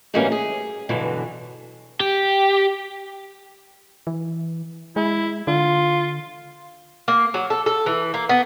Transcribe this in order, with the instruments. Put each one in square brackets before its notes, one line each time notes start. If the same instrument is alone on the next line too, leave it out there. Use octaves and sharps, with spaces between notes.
[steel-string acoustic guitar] G#2 E3 F#3 G3 A#3 C#4
G#4
G2 B2 D3 E3 F#3
[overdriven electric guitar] G4
[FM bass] E3
[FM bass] G#3 [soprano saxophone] E4
[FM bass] D3 [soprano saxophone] F4
[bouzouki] A#3
F#3
A4
A4
E3
A#3
B3